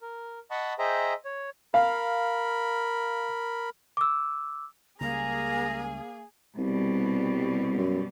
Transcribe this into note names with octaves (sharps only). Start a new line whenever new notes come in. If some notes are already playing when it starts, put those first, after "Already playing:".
A#4
D#5 F#5 A5 B5 C#6 D#6
G#4 C5 D#5 E5 G5 A#5
C#5
A#4 F5 B5
D6 E6
C#2 C#3 G3 A#3 G#4 A#5
C2 B2 G3
F#2